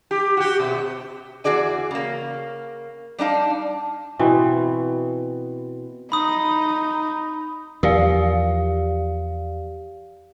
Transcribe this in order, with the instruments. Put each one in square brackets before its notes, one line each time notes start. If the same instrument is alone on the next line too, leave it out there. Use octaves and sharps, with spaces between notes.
[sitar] G4
F#4 G4
B2
[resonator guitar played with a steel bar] E2 G2 F#4 G#4 D5 G#5
C#3 A#3
G3 D4 D#4 F5
[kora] B2 E3 C4
[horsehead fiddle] D#4 [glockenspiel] B5 D#6
[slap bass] E2 F3 [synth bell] G4 D5 F5